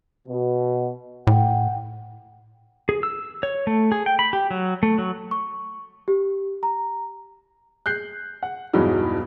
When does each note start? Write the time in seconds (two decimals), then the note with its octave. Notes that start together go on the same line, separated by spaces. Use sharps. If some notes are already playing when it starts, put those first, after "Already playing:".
0.28 B2
1.27 A2 F#5 G5
2.89 G#4
3.03 E6
3.43 C#5
3.67 A3
3.92 G#4
4.06 G5
4.19 B5
4.33 G4
4.51 F#3
4.83 A3
4.98 F#3
5.31 C#6
6.08 G4
6.63 A#5
7.86 F#6 G6 C7
8.43 F#5
8.73 E1 E2 G2 E3 F#3 D#4